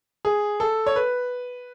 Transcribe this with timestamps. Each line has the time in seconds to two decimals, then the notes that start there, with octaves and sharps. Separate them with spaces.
0.25 G#4
0.60 A4
0.86 C#5
0.96 B4